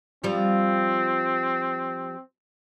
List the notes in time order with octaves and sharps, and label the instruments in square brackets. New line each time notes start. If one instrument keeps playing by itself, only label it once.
[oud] F3 G3 [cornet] C4